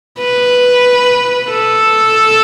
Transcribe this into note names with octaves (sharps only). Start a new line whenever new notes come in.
B4
A4